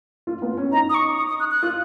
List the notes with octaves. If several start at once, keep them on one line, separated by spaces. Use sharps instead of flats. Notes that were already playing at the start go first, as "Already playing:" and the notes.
F4
B3
C#4
D#4 A#5
D#6
C#6
D#6
D#6
F#6
F#6
F4